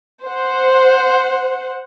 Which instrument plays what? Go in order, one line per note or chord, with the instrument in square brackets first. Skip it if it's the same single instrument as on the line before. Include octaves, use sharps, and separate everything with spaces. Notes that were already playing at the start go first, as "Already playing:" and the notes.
[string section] C5 F#5